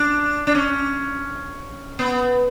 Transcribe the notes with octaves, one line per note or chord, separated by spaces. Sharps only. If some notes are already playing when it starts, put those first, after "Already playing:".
Already playing: D4
D4
C#4
B3